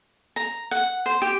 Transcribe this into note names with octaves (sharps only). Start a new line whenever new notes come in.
A#5
F#5
C5
G4